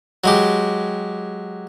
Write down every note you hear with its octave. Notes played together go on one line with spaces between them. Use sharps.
F#3 G#3 G4